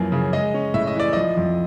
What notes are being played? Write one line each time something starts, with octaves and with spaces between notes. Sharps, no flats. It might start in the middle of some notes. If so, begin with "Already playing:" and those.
Already playing: F#2 E3 F3 A#3
C#3
G#3 D#5
C#4
A2 E5
D#5
E3 D5
F3 D#5
F2